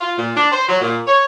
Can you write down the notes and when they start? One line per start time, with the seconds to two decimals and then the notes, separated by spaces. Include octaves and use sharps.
0.01 F4
0.17 A#2
0.36 D4
0.52 C5
0.68 F#3
0.81 A#2
1.07 C#5